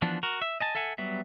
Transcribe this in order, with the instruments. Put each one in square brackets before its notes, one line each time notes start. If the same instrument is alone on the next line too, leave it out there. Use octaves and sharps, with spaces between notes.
[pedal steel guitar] E3 F3 B3 D4
F#4 A#4
E5
D#5 G#5 A5
A4 E5 F#5 G#5
F#3 G3 B3 E5